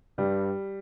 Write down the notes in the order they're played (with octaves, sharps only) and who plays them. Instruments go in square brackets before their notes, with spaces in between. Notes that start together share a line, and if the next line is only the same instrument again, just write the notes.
[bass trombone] G2 [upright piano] G3